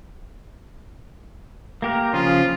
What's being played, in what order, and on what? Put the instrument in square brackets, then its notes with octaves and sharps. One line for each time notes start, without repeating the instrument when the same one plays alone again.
[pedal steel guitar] A#3 G4 A#4
[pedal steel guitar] C#3 F3 G#4 [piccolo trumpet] F4